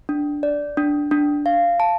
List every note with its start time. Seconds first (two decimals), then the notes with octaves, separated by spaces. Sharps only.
0.09 D4
0.43 D5
0.77 D4
1.11 D4
1.46 F5
1.80 A5